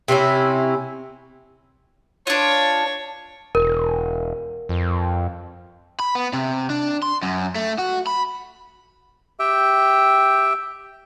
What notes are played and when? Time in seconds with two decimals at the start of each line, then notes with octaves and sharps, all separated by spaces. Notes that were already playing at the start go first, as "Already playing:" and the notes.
0.08 C3 C4 C#4 E4
2.27 D4 F4 C#5
3.55 E1 A#4
4.69 F2
6.00 B5
6.15 B3
6.33 C3
6.70 D4
7.02 C6
7.22 F#2
7.55 A3
7.78 F#4
8.07 B5
9.40 G4 E5 G5